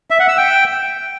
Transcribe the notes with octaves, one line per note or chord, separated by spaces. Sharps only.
E5
F#5
E6
G5